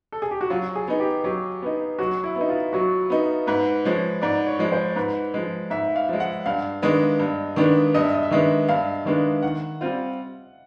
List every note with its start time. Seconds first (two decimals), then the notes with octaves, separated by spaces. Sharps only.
0.12 A4
0.22 G#4
0.31 G4
0.41 F#4
0.50 F#3 F4
0.75 G#4
0.88 B3 D#4
1.00 G4
1.24 F#3 G4
1.62 B3 D#4
1.99 F#3 F#4
2.24 E4
2.36 B3 D#4
2.49 F4
2.73 F#3 F#4
3.10 B3 D#4
3.47 G#2 B4
3.85 F3 G#3 C#5
4.22 G#2 D5
4.47 C#5
4.59 F3 G#3
4.72 C5
4.96 G#2 B4
5.34 F3 G#3
5.70 G#2 E5
5.96 F5
6.09 F3 G#3
6.20 F#5
6.46 G2 F5
6.82 D#3 G#3 B3 D4 D#5
7.19 G2
7.56 D#3 G#3 B3 D4
7.94 G2 D#5
8.03 E5
8.14 D#5
8.23 E5
8.31 D#3 G#3 B3 D4 D#5
8.69 G2 F5
9.05 D#3 G#3 B3 D4
9.42 D#3 F#5
9.81 G3 C4 F4